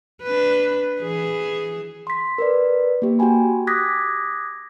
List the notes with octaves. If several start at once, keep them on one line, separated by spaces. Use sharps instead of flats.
D4 B4
E3 G#4
C6 B6
A#4 B4 D5
A#3 G4
F#4 G4 G5 G#5 B5
D6 D#6 F#6 G#6 A#6 B6